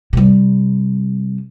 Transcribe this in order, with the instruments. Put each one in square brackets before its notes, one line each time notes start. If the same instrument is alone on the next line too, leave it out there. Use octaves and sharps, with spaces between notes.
[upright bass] C3 G3